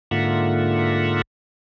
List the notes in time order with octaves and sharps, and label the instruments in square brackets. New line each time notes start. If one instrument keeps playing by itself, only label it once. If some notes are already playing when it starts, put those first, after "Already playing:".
[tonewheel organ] G#2 D3 A#3 F4 E5 F#5